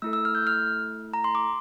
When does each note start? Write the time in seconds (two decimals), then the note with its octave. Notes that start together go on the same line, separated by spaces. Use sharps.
0.02 A3 E4 A4 E6
0.13 E6
0.25 F6
0.35 G6
0.47 F6
1.14 A#5
1.24 C6
1.35 D6